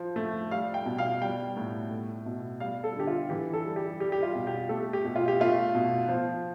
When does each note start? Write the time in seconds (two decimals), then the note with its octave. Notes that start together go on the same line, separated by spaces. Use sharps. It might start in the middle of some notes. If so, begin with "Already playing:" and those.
Already playing: F3
0.16 A3
0.51 G3 F5
0.74 G5
0.86 B2
0.98 F5
1.22 G3 G5
1.56 A2
1.91 A3
2.26 B2
2.60 G3 F5
2.84 A4
2.96 D3 G4
3.07 F4
3.30 E3 G4
3.53 A4
3.65 G3
3.76 G4
4.00 G3 G4
4.12 G4
4.23 F4
4.35 B2
4.47 G4
4.69 A3 A4
4.93 G4
5.05 B2
5.16 F4
5.28 G4
5.40 A3 F4
5.75 B2
6.09 F3